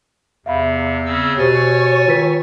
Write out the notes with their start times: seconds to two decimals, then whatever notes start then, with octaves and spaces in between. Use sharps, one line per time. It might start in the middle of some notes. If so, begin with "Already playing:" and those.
0.46 E2 C3 E5 F5 B5
1.06 C#3 C4 E6
1.38 B2 G4 C5 C#5 G#5 A6
2.08 D#3 F4 B4 B6